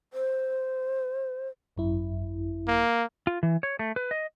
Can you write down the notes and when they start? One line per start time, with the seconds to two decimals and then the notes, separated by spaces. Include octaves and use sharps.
0.13 C5
1.76 G#1 F#2 E4
2.68 A#3
3.27 F4
3.43 E3
3.63 C#5
3.79 A3
3.96 B4
4.11 D#5